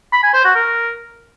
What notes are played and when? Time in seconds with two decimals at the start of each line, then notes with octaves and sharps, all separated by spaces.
0.12 B5
0.23 G#5
0.34 C5
0.44 F#4
0.55 A#4